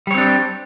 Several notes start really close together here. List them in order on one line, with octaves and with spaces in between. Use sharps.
G3 C#5 C4 D4 G4